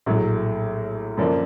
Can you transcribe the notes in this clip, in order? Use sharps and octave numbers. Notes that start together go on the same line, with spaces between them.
A#1 A2 F#3 A3
F#2 D3 F3 A#3 D4